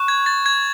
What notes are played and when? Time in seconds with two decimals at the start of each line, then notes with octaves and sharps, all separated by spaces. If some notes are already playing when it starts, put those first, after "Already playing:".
Already playing: C#6 F#6
0.08 G#6
0.26 A6
0.46 G#6